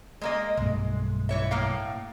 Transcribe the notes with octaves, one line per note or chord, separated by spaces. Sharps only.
G#3 A#3 D#5
B1 G2 G#3 A3
E3 C#5 E5
A2 A#3 F5